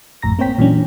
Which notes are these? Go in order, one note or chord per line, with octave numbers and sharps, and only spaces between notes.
A1 F2 A2 A#5 A#6
A#3 C4 C5 C#5 G5 B6
A#2 E3 F#3 C#4 D4